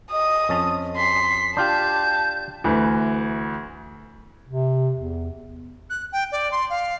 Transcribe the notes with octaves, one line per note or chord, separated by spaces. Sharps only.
D#5 D#6
F2 C#4 A5
C6 B6
D4 F4 G4 A5 G6
D2 E3
C3
E2
F#6
G5
D5
C6
F5